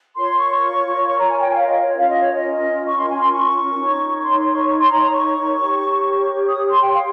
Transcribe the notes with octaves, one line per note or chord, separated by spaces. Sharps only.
F4 A#4 C#5 C6
C#6
C#6
A#5
G#5
G5
F5
D#5
C#5
C#4 F4 A#4 F5
D#5
C#5
D#5
C#6
C6
G#5
C6
C#6
D#4 A#4 C#5
C6
C6
C#6
C#6
C6
A#5
A#5
C#6
G4 A#4 C#5
D#6
C6
G5
F5